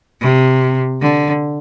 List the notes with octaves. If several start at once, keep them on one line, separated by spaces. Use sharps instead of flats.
C3
D3